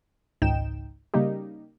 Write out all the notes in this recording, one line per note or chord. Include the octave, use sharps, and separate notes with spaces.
G#1 C#2 G#2 D#4 G5 E7
C#3 G3 A#3 D#4 G4